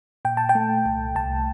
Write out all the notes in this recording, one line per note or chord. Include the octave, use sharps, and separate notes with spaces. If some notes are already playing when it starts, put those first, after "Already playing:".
A#2 G5
A5
G5
A3
C2
C2 A5